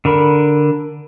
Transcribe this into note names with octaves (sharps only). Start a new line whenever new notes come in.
D3 A#4 B5